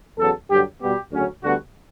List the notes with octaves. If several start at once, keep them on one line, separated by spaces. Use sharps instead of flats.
E2 C#3 F#3 A4
G2 D3 F#3 G4
B2 G3 B3 G4
D2 C#3 F#3 C#4
D2 D3 G3 B3 F#4